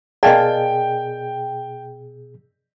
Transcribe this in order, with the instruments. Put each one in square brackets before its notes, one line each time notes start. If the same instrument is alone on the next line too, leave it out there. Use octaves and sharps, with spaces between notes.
[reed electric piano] B2 G#4 [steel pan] A#4 F5 A5 [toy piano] D5 D#5 [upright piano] G5